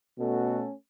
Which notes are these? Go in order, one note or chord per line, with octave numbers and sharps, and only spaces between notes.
B2 A3 C#4 F#4 A4